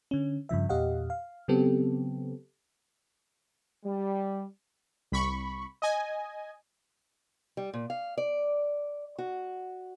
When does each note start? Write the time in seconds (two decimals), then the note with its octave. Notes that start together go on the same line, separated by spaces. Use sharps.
0.11 D3 C#4
0.49 G2 C#3 F3 E5
0.69 E2 A#2 G4 D#5 F5 F#5
1.10 F5
1.48 C#3 F#3 B3 C4 G4 A4
3.85 G3
5.12 C2 B5 C#6
5.82 D#5 G#5
7.57 G3
7.74 A#2
7.90 F5
8.18 D5
9.18 F#4